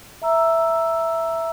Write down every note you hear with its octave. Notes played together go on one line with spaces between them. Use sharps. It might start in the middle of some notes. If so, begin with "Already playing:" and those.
E5 A#5 E6